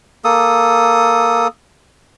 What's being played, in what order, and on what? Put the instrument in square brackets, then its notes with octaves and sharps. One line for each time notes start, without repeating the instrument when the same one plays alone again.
[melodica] A#3 A4 D#6